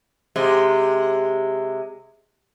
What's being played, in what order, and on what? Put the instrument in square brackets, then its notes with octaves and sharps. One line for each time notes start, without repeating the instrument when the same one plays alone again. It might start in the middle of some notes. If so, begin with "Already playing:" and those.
[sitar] C3 G#3